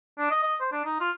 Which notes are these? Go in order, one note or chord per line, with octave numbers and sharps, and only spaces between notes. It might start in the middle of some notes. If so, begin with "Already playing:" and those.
D4
D#5
D#5
C5
D4
D#4
F4